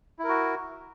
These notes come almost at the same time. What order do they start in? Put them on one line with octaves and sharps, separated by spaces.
E4 A#4 F#4